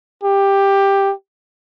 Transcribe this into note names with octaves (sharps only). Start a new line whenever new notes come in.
G4